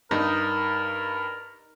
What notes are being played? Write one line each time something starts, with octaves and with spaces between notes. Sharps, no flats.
G2 D#4 A#4